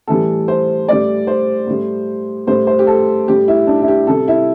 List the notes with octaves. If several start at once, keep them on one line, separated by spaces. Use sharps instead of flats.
A2 E3 G3 A4
C5
A2 G3 D5
C5
A2 G3
A2 G3 C5
C5
G4
A4
A2 G3 G4
E4
D4
E4
G4
C3 G3 A4
E4